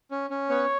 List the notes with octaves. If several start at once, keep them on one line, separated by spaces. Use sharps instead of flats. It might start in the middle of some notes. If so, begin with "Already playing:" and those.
C#4
C#4
B3 C#5